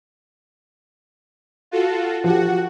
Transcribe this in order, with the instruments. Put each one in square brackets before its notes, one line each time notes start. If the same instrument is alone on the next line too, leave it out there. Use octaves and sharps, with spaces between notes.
[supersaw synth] F4 F#4 A4
[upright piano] F3 G4 [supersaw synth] F#4 F#5